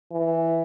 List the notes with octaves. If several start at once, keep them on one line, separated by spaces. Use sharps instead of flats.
E3